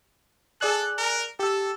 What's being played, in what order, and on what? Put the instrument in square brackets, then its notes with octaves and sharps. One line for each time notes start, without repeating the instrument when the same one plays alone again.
[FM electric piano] G#4 D5 F#6 [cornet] A4
[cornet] A#4
[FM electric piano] G4 E6 [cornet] A4